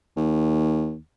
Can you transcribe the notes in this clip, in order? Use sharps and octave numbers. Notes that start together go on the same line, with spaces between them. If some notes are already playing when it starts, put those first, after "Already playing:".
D#2